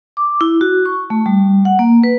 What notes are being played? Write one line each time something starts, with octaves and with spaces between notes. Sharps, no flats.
D6
E4
F#4
C#6
A3
G3
F#5
A#3
B4